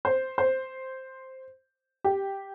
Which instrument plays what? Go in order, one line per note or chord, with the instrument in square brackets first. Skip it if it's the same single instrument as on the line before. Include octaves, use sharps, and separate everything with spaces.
[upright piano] C5
C5
G4